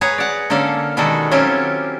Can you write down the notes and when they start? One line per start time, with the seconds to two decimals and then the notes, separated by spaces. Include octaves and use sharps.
0.01 G#4 B4 C#5 F#5 A#5
0.18 D5 F#5
0.50 D3 A#3 C#4 A4 F5
0.97 B2 D#3 G3 G#3 F#4 A4
1.31 F#3 C4 C#4 E4 F4 G4